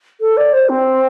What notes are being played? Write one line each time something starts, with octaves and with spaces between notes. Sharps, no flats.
A4
D5
C5
C4